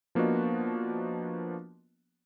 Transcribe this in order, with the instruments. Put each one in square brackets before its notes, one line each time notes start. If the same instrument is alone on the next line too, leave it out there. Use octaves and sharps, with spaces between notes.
[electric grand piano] F3 A#3 B3 D4 F#4 D#5